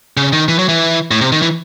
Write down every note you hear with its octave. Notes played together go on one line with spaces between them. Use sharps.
C#3
D#3
E3
F#3
E3
A2
C3
D#3
E3